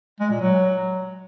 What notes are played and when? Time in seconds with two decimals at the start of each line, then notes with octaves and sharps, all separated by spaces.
0.20 G#3
0.30 A#2
0.41 F#3